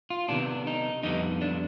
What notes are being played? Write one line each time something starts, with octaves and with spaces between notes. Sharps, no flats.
F4
C3 D#3 B3 D4
D#4
F2 D3 G3 B3 D#4
D4